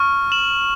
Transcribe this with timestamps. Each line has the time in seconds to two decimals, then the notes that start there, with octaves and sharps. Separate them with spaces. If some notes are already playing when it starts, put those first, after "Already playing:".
Already playing: C#6 F6
0.32 E7 F#7